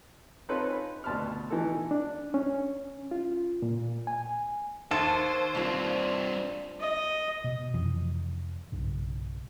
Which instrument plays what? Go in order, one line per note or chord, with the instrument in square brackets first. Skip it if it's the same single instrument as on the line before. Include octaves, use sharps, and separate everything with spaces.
[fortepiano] C4 C#4 D#4 F4 A4 B4
B5
D2 B2 A5 B5 C6 F6
B2 E3 D#4 A4
[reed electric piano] D4
C#4
F4
A#2
G#5
[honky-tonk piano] D#2 [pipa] A4 [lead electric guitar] C5
[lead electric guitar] G2 C4 [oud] D4 F4
[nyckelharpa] D#5
[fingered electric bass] B2
F2 C3 E3 F3
B1 G2 C#3